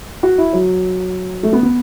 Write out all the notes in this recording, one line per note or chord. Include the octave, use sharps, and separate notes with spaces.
F#4
E4
F#3
A3
B3
B3